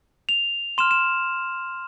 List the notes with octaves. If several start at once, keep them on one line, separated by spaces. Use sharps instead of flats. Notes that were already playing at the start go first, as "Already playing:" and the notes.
F7
C6 F6 E7
E7